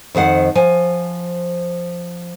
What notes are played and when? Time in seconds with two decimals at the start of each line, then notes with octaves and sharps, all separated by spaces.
0.15 F2 D#3 C5 F#5
0.55 F3 G#5